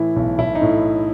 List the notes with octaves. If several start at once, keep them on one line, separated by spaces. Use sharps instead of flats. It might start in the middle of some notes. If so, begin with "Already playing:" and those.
Already playing: A2 E3 E4
B1
B1 E4
D#4
A2